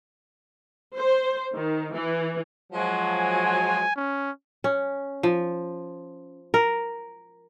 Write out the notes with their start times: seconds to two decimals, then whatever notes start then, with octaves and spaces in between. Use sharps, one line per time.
0.94 C5
1.54 D#3
1.93 E3
2.73 F3 F#3 G#3
3.12 G#5
3.96 C#4
4.64 C#4
5.23 F3
6.54 A#4